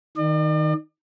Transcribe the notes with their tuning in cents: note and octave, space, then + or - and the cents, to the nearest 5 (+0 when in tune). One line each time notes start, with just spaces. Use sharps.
D#3 +0 D5 +45